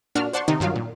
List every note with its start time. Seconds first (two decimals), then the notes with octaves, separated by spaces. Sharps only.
0.15 A#2 D4 F#4 F6
0.33 C5 D5 F#5 A5 C6 C#6
0.48 C3 D#3 D#4
0.60 G2 D#3 F#3 F4 F5
0.76 A#2